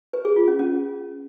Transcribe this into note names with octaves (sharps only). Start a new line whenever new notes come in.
B4
G#4
F4
C#4
C#4